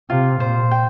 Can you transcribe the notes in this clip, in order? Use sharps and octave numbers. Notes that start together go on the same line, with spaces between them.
C3 F4
A#2 C5
G5